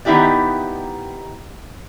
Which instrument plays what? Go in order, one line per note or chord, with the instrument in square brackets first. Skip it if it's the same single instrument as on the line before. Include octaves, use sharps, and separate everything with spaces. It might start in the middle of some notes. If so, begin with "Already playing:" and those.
[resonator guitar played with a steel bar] D#3 B3 D#4 E4 G4 D5